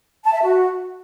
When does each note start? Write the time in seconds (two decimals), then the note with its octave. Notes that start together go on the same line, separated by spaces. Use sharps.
0.24 A5
0.33 E5
0.41 F#4